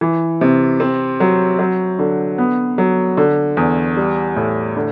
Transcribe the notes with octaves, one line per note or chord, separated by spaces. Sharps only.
E3
C3
C4
F#3
F#3
D3
B3
F#3
D3
E2
G3
A2
D3